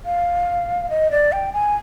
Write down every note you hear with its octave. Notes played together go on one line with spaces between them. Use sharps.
F5
D#5
D5
G5
G#5